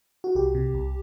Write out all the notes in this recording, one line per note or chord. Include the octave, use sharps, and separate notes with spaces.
F#4
C2 G4
C3
C2